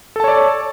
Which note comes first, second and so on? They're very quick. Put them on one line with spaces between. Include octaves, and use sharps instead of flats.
A4 A5 C#5 D5